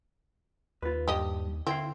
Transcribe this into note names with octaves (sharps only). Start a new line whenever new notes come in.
D#2 F4 B4
G2 G4 D#5
D3 C4 E4 F5